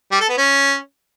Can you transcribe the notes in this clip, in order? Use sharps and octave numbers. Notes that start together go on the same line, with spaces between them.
G3
A4
B3
C#4